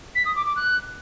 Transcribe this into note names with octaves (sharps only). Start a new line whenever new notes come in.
B6
D#6
D6
D6
F#6